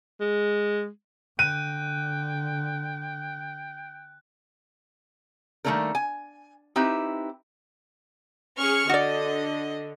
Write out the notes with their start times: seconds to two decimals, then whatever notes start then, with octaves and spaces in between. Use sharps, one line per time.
0.20 G#3
1.39 D3 G5 F#6 D#7
5.65 D#3 G3 A3 A#3 D4 A#4
5.95 G#5
6.76 C4 D#4 E4 G4 B4
8.58 C#4 G#4 C#6 F6
8.89 D3 F#4 D5 D#5